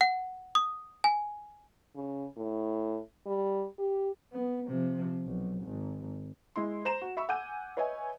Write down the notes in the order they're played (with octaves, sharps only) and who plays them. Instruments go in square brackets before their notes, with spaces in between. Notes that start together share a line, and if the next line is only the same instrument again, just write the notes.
[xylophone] F#5
D#6
G#5
[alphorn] C#3
A2
G3
G4
[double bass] B3
C3 F3
B1
G#1
[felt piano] G#3 E4 C6
C5 A#5 E7
F#4
E5 B5 C#6 E6
F#5 G#5 D6 E6 G6 D#7
B4 C#5 D#5 E5 G#5